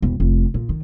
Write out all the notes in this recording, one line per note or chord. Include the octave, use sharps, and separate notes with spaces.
E1
F1
A#2
D#3